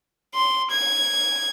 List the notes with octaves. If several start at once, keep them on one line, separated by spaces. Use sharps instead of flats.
C6
G#6